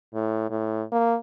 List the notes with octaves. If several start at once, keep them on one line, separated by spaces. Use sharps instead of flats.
A2
A2
A#3